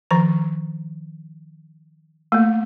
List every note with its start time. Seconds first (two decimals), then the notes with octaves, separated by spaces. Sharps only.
0.11 D#3 F3 A#5
2.32 A3 A#3